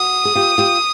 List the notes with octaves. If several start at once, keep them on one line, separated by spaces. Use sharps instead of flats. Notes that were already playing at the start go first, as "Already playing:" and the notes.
Already playing: F#4 D#6
G#4
F4 G4
F4 G4